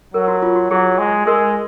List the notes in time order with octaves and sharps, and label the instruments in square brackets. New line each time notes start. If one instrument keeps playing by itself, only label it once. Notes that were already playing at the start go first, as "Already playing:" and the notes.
[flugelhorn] F#3 [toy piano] A#4
[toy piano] F#4
F4
F#4
[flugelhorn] F#3 [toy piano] G#4
[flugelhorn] G#3
[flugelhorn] G#3 [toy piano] A#4